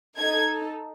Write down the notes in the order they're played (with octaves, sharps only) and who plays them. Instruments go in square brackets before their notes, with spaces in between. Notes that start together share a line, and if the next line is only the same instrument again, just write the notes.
[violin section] D#4 A4 G#6